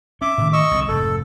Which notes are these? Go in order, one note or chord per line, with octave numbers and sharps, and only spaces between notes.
C#4 E5 D6
A2 D#3
D#5 C#6 E6
C2 D3
F1 F2 G#2 A4